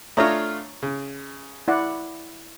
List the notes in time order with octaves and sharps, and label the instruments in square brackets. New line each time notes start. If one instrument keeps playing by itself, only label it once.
[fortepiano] A3 D4 F4 [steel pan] C#5 A#5 D#6
[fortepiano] C#3
[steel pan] E4 D5 F#5